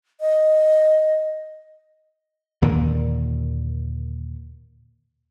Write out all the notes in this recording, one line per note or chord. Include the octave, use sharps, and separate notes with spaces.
D#5
D#2 A#2 D3 D#3